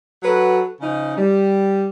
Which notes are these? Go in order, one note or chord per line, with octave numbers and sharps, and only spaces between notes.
F#3 F#4 A4 B4
C#3 F3 D#4
G3